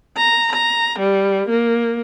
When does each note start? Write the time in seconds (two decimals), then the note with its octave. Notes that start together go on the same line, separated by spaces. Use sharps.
0.17 A#5
0.53 A#5
0.99 G3
1.49 A#3